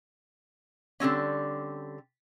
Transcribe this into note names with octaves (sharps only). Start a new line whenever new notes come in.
D3 G3 C4 C#4